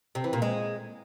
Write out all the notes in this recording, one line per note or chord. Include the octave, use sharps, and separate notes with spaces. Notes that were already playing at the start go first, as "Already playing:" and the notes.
C3
E3
A#2
G#3